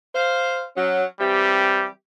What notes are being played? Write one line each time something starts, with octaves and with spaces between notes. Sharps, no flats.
C5 F5
F#3 C#4
E3 G3 C4 G4